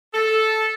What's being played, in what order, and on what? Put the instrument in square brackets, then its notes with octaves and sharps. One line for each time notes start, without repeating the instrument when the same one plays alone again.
[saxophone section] A4